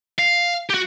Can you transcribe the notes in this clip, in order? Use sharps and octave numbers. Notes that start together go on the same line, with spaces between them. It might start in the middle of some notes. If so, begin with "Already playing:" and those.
F5
F#4 G4